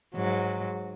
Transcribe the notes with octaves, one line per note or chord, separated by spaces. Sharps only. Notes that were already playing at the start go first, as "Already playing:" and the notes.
G#2 F#3